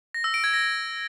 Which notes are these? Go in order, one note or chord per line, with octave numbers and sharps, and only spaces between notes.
A#6
E6
D7
G#6
A#6